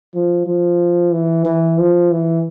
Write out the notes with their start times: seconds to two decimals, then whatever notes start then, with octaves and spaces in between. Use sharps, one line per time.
0.14 F3
0.46 F3
1.13 E3
1.45 E3
1.79 F3
2.11 E3